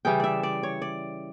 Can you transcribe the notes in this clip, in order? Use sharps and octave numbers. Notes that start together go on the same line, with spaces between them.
C#3 E3 G3 G5
D5 E5
D5
C#5
D5